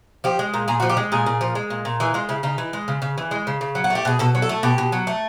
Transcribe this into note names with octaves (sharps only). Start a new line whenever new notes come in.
F3 G4
G#3
A#2
A#2 G#4
F3 F#4
G4
G#3
A#2 G#4
A#2
F3
G#3
A#2
A#2
E3 G#4
G#3 F4
C#3 E4
C#3 D#4
E3
G#3
C#3
C#3
E3
G#3
C#3
C#3
F#3
F#4
A3 G4
B2 G#4
B2 A4
F#3
A4
A3
B2 G4
B2
F#3
A3